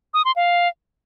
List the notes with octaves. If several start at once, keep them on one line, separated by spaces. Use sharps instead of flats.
D#6
C6
F5